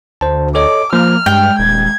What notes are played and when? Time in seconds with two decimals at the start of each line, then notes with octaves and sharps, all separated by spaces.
0.21 D2 C5 A5
0.55 A4 C#5 D#5 D6
0.93 F3 A#3 F6
1.26 G2 G#3 G5
1.59 D#1 G#6